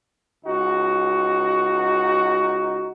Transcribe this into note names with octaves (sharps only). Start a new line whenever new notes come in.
C#2 D#4 F#4